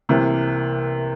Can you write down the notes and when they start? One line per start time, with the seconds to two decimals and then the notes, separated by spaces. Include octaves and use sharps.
0.09 C2 C3 E3 A#3